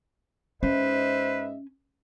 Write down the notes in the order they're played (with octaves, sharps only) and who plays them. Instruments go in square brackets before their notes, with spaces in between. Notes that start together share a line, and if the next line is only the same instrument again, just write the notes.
[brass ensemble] G#2 D#5 E5 [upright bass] C#4 [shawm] B4 [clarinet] C5